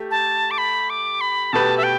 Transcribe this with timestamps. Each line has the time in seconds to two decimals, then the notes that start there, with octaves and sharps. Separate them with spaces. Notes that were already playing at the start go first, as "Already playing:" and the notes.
Already playing: A3 G4
0.11 A5
0.51 D6
0.58 B5
0.90 D6
1.21 B5
1.53 B2 A3 G4 B4 A5
1.78 E5
1.83 G5